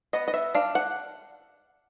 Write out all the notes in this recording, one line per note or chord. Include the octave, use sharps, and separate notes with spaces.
B3 D#5
D#5
E5
D4 F5
F#5